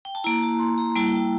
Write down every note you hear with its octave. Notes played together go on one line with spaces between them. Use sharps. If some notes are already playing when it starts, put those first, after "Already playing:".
G5
A5
A#3 E4 A#5
A5
C6
A#5
G3 A#3 E4 A5
G5
A5